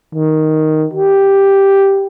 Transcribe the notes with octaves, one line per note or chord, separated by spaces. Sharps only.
D#3
G4